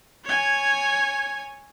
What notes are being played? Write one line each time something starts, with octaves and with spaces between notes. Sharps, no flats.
C#5 G#5